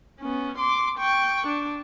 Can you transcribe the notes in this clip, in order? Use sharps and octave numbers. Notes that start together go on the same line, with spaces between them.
B3 C#4
C6 D6
G5 C#6
D4